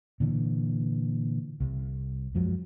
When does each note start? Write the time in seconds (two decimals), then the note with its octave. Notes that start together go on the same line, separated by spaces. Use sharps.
0.20 A#2 D3 E3
1.60 C2
2.35 F#2 F3 F#3 G#3